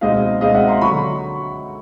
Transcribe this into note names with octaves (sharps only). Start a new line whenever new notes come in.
C#2 B2 G#3 C4 D#4 D#5 F5
C#2 B2 G#3 C4 D#4 D#5 F5
E5 F#5
A#5 C6
D3 F#3 B5 C#6